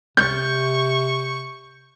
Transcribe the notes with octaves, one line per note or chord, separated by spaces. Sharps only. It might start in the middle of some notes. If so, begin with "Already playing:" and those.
C3 C#6 G6